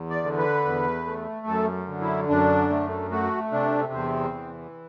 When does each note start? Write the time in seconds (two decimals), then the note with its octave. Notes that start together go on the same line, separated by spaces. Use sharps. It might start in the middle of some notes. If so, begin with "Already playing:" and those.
Already playing: E2
0.10 D5
0.24 D3
0.38 B4
0.65 E2
1.06 A3
1.47 F#2 A4
1.88 D3
2.02 E4
2.29 F#2 D4
2.70 A3
3.11 A3 F#4
3.52 C3 D4
3.93 E2 C4
4.34 E3